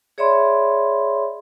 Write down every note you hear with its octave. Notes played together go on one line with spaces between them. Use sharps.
G#4 C#5 D5 E5 B5 C6